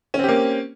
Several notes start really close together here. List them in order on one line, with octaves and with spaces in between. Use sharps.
C#4 C4 G4 A#3